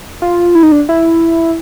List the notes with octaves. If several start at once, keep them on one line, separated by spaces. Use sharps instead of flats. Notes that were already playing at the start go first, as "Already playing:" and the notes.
F4
E4
D#4
D4
E4